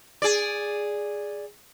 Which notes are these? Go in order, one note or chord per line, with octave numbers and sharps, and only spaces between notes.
G#4 D5